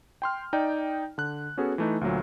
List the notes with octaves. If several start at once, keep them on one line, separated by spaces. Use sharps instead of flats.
G5 C6 F6
D#4 D5 G5
D3 F#6
B3 C#4 F#4 G#4 A4
E3 A3 D#4
D2 A#2 F#3